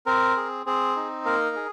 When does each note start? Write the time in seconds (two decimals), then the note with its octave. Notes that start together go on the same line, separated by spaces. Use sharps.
0.06 C4 A#4
0.36 G#4
0.66 C4 G#4
0.96 D#4
1.25 A#3 A#4
1.56 G#4